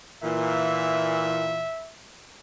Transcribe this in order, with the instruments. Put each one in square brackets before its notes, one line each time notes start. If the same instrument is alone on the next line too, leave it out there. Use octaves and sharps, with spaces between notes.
[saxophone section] A#2 E3 [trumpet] E5